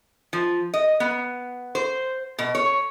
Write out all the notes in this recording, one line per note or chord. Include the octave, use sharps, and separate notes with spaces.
F3
D#5
B3
C5
B2
C#5